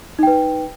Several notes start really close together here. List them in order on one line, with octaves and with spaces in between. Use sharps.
D#4 G5 B4